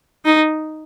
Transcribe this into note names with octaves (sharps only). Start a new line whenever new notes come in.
D#4